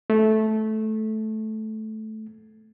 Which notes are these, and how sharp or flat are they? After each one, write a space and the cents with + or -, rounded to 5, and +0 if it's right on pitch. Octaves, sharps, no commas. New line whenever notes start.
A3 -10